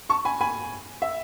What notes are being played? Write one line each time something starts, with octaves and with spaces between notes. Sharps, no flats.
A5 C#6
G#5 B5
G#5 B5
E5